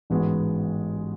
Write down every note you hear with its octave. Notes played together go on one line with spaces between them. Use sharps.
A1 G#2 G#3 B3 F#4